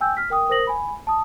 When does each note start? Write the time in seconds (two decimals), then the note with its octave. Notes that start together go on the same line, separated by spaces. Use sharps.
0.01 G5 G#5 E6 G6
0.17 F6 B6
0.30 A#4 G5 D#6
0.50 A#4 C5 D#6 A#6 F#7
0.67 G#5 B5
1.07 A5 D#6